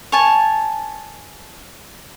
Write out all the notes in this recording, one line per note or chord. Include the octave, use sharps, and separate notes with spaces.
C#5 G#5 A5